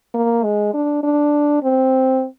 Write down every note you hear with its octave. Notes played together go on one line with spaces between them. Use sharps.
A#3
G#3
D4
D4
C4